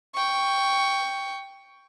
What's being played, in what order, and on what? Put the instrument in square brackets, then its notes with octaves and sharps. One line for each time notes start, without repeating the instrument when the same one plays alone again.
[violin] G5 C#6